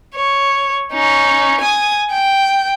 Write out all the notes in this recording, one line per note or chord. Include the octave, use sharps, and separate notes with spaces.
C#5
C#4 D#4
G#5 D#6
G5